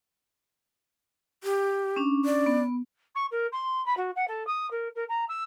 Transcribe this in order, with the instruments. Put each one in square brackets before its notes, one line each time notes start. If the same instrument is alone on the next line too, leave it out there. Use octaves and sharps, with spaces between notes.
[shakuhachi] G4
[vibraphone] C#4 D4
[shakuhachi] D5
[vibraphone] B3
[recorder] C#6
A#4
C6
B5
F#4
F#5
A4
D#6
A#4
A#4
A#5
E6